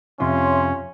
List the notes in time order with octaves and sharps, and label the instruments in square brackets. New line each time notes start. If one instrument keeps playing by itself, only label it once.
[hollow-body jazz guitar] F2 C3 F4 [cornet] C#4 [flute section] C#5 E5 C6